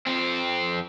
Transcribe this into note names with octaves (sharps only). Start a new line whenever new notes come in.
F2 C4